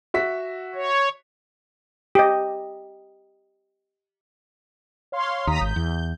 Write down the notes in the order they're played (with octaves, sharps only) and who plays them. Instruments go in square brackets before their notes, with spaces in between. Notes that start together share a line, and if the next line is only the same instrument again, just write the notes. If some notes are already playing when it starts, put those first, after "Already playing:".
[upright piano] F#4 E5 B6
[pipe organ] C#5
[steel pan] G4 D#5
[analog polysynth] C#5 F5 C6
[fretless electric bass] D#2 [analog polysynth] A#5 D#6 B6
[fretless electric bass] G#1 [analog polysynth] G6
[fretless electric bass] E2